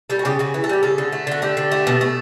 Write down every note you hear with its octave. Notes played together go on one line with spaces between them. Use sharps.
G3 A4
F#4
C#3 G4
C#3 F#4
E3
A4
G3 G4
C#3 A4
D3
A3
D3 F#4
A3 G4
D3
A3
B2
A3